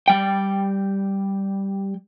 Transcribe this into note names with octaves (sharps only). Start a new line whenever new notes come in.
G3 G5